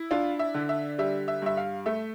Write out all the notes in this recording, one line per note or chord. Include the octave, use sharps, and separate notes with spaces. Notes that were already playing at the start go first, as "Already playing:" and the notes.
Already playing: E4
D4 F4
E5
D3
E5
G3 E5
E5
G2 E5
F5
A3 E5